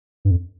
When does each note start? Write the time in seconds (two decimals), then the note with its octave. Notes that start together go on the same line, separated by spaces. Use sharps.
0.25 G2
0.31 F2